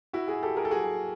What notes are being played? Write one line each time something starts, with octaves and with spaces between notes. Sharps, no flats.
E4 F#4
F#4 G#4
G4 A4
G#4 A#4
A4
F#4 G#4